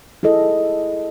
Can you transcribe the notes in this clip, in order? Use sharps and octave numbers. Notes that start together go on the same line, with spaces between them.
E4 G#4 A4 D#5